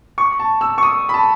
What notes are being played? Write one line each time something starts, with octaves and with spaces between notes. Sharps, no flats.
C#6
A5
E6
C#6
D#6
B5
A5